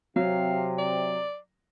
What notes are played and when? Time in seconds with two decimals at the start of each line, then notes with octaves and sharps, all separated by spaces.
0.16 C3 F#3 F5
0.78 D5